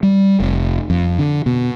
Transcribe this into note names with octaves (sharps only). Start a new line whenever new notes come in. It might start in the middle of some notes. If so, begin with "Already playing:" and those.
G3
F1
F2
D3
B2